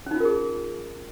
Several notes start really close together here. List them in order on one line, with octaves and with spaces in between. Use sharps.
C#4 D#4 F4 A#4 G#4